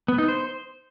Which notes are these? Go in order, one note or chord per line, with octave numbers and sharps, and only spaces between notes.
B3
D#4
C5